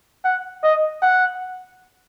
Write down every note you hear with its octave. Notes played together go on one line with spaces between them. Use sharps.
F#5
D#5
F#5